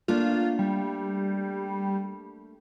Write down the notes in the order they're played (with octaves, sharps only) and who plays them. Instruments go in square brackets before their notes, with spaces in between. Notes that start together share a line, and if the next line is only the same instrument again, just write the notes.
[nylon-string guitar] A3 A#3 D4 [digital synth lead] F4
[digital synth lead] G3